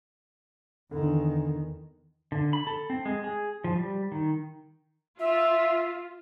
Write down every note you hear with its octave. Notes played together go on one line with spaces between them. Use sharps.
E2 D3 D#3
D3
B5
A4
C4
G#3
G#4
F3
G3
D#3
F4 E5